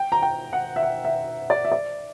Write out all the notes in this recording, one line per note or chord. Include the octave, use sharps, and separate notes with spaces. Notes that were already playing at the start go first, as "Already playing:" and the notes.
Already playing: G5
A#5
G5
F#5
E5
F#5
E5
D5
E5
D5